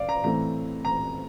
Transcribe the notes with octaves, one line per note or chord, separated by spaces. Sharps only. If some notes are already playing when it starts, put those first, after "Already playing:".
Already playing: D5 F5
A#5
A2 E3 A3 C4 A#5
A#5